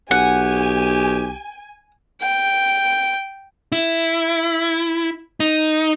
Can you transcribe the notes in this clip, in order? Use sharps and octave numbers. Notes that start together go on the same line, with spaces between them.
B1 G4 F#5 G#5
G5
E4
D#4